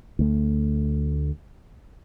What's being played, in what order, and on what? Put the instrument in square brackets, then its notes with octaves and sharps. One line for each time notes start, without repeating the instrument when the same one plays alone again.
[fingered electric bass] D2 A3